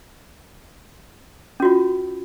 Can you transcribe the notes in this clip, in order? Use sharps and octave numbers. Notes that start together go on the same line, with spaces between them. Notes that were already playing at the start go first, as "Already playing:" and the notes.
C#4 F4 F#4